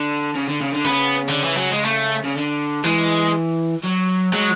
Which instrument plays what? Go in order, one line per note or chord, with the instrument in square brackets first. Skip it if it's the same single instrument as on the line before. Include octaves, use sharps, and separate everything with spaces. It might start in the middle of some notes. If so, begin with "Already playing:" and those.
Already playing: [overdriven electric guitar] D3
C#3
D3
C#3
D3
[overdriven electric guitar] C#3 [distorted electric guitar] B3
[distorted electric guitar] D3
E3
F#3
G#3
A3
[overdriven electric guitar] C#3
D3
[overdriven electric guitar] E3 [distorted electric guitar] G#3
[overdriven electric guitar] F#3
[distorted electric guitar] F#3 [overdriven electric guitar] G#3